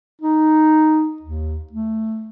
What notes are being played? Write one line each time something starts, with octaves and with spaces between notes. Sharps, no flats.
D#4
D#2
A3